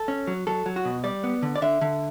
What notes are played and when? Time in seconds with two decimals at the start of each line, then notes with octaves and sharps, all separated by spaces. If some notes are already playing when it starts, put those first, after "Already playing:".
Already playing: A4
0.08 C#4
0.27 F#3
0.47 F#3 A4
0.66 F#3
0.76 F#4
0.85 B2
1.04 G3 D5
1.24 B3
1.42 D3
1.56 D5
1.62 D3 E5
1.81 D3